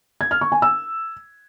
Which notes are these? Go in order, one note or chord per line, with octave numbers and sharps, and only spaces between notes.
G#6
F6
C#6
G#5
E6